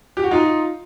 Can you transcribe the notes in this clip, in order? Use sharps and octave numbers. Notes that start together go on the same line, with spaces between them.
G4
F#4
D#4 F4